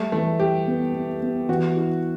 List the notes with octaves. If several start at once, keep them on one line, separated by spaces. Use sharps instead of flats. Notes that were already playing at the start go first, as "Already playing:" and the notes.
Already playing: G3 A3
E3 A3
G3 G4
B3
B3
B3
E3 F#4
E4